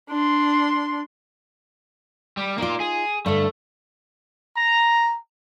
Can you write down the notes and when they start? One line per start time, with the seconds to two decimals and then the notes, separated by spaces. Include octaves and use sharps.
0.10 D4 C6
2.37 G3
2.58 A#3 D#4 F4 D5
2.80 G#4
3.26 G2 D3 A3
4.56 A#5